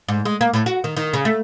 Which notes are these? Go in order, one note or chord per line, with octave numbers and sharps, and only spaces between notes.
G#2
G#3
A#3
A2
F#4
D#3
D#3
C#3
A3